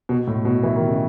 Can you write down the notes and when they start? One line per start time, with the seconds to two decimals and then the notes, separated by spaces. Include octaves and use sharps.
0.09 B2
0.27 A2
0.45 B2
0.63 E3
0.76 D#3
0.88 C#3